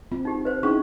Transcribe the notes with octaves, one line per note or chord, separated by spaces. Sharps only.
C4 F4
D#4 G4
B4 C5
C#4 D#4 E4 G#4 C#6